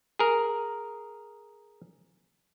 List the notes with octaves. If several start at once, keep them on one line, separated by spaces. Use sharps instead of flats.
G#4 A#4